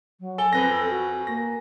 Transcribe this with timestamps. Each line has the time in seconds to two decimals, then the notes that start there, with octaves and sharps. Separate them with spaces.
0.20 F#3
0.38 A4 G#5 G7
0.53 F2 C4 B4 A#6
0.69 A4
0.89 F#4
1.27 A#3 A#6